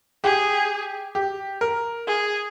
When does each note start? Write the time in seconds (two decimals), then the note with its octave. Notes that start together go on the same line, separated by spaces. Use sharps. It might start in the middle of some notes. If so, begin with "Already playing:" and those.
0.24 G4 G#4
1.15 G4
1.61 A#4
2.07 G#4